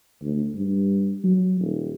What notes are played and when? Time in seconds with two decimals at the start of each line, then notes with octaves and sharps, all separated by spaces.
0.23 D2
0.55 G2
1.24 F#3
1.60 D#1